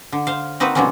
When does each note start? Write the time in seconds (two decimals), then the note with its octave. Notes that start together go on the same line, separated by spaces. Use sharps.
0.12 D3
0.27 C5 F5
0.60 A#3 C4 D#4 F#4 B4
0.75 B2 D3 F3 G3 C4 C#4